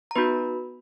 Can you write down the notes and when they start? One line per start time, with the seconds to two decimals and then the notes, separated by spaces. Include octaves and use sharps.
0.11 A#5
0.16 B3 D#4 F#4 B4 B5